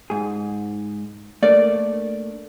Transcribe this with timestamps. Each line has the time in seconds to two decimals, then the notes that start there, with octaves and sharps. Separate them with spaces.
0.10 G#2 G#4
1.43 A3 A#3 D4 D5